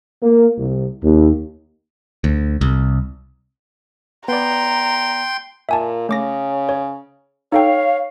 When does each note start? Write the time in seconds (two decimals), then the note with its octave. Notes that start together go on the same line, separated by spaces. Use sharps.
0.21 A#3
0.58 C2
1.02 D#2
2.24 D2
2.61 C2
4.28 B3 D5 G5 A#5 C6
5.69 A#2 E5 G#5 A5
6.09 C#3 A3 D6 A#6
6.69 C#5
7.52 D#4 A4 C#5 F5 G5